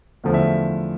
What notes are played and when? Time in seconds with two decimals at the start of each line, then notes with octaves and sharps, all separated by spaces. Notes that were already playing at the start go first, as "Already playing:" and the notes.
0.24 E2 D3 F3 A3
0.34 E5